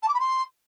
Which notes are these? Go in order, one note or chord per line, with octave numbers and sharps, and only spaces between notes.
A5
D6
B5
C6